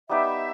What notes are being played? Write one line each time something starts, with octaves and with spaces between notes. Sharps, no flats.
G3 B3 D#4 G4 E5